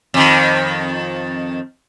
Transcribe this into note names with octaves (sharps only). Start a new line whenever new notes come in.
F2 D#3